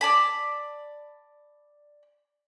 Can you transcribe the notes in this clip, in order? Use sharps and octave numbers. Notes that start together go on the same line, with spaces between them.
D5 A5 B5